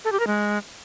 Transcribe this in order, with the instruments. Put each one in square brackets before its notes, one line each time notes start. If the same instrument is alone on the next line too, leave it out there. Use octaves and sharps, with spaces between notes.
[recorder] A4
G4
A#4
G#3